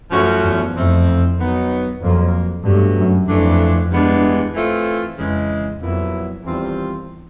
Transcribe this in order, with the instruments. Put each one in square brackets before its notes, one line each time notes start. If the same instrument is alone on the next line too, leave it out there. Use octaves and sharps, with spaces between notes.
[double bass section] F#2 [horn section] F3 A3 C#4 F#4
[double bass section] E2
[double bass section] F2 [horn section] F3 A3 C4 E4
[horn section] D#3 F#3 B3 D#4
[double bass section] F2 [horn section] A#2 F#3 A#3
[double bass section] G2 [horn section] B2 F#3 A3
[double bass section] F#2
[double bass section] F2 [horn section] E3 A3 D4
[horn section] G2 E3 G#3 B3 D4
E3 A3 C4 F4
[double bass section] F2 [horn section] C#3 E3 G#3
[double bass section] F2 [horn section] A#2 F#3 B3 E4
[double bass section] E2 [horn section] D#3 G3 C4 F4